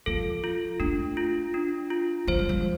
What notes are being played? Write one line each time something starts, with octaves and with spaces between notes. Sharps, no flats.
F3 A4
F4
A3 D4
F4
D4
F4
F3 C5
G3
F3